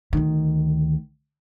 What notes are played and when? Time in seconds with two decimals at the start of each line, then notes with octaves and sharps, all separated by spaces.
0.13 D2 D#3